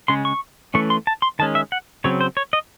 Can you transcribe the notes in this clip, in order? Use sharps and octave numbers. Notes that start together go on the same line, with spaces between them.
C#3 G#3 C#4 C6
C#6
E3 A3 C#4 C#6
C6
A5
C6
D#3 G#3 C#4 A5
E5
F#5
C#3 F#3 C4 C#5
C5
C#5
D#5